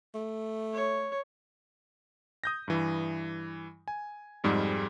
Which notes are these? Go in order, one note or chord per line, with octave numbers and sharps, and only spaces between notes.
A3
C#5
D#6 G6 A#6
G2 E3
G#5
F2 G#2 G3 G#3